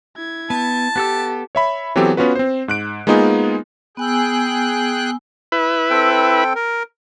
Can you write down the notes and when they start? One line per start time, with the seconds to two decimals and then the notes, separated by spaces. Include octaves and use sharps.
0.16 E4 G#6
0.50 B3 A5
0.96 B3 G4 A4 E6
1.55 C#5 E5 B5
1.96 E3 F#3 B3 C4 G4 A4
2.17 B3 C#4 F4 F#4 B4
2.35 C4 C5
2.68 G#2 F#6 D7
3.07 G#3 A#3 B3 D#4 F4 G#4
3.97 B3 G#4 G5 G#5 E6 F#6
5.52 E4 B4
5.90 C4 A4 G5
6.55 A#4